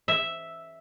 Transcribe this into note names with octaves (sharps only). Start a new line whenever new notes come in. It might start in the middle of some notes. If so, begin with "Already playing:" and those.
E5